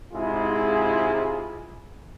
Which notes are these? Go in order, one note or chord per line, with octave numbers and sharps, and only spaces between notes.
G#2 C3 G#3 E4 F4 G#4